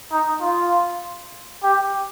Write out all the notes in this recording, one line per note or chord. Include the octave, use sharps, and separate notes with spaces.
D#4
F4
G4